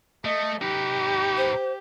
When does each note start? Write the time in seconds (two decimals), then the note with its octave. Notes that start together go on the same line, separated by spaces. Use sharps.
0.25 A3 D#5
0.62 D#4 G4 B4
1.37 C5